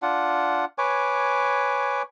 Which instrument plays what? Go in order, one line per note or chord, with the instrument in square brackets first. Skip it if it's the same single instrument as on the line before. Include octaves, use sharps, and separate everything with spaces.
[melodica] D4 F4 F#5
B4 C#5 G#5 D6